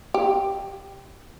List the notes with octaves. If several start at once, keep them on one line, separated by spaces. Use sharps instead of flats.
G4